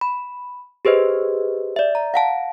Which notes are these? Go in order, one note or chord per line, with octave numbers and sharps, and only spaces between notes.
B5
G4 G#4 B4 C5 D#5
D5 E5
A#5
F5 F#5 A5